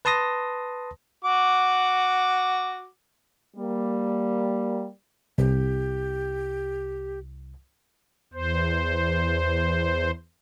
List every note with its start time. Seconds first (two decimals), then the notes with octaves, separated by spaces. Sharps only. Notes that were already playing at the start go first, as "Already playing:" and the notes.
0.05 B4 A5 C6 D#6 A#6
1.24 F#4 F#5 D6
3.56 G3 A#3
5.38 C2 G4
8.33 E2 C5